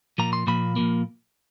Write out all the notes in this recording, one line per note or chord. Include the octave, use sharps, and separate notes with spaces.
A#2 F3 A#3 A#5
C6
A#2 F3 A#3 B5
A#2 F3 A#3